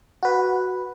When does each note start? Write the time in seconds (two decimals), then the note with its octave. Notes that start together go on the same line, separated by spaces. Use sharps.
0.23 F#4 B4